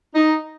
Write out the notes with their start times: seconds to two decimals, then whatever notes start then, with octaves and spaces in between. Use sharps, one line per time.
0.14 D#4